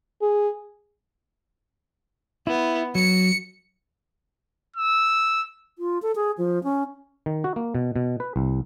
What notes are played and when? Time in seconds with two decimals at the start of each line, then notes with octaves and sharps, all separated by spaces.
0.22 G#4
2.47 B3 E4
2.95 F#3 C#7
4.76 E6
5.79 F4
6.02 A4
6.16 G#4
6.38 F3
6.64 C#4
7.26 D#3
7.44 F#4
7.56 A#3
7.75 B2
7.96 B2
8.20 B4
8.36 C2